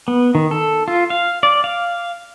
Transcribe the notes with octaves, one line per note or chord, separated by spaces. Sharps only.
B3
D#3
A4
F4
F5
D5
F5